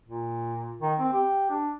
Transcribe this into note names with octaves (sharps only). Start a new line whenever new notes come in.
A#2
D#3
C4
G4
D4